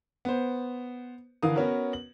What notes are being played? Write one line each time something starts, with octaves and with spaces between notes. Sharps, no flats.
B3 C5
D3 E3 A#4 F5 D#6
B3 C#4 F#4 A#4 B4
F#7